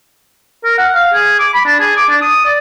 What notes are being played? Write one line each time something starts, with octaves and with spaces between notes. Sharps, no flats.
A#4
F#5
F5
G#4
D6
B5
D4
G#4
D6
D4
D#6
D5